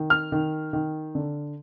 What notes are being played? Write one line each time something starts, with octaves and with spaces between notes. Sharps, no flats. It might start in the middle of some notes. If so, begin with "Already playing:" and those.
Already playing: D#3
F6
D#3
D#3
D3